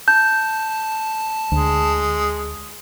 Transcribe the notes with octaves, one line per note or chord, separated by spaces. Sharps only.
A5 G6
D2 G#3